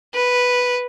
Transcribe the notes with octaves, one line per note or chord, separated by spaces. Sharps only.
B4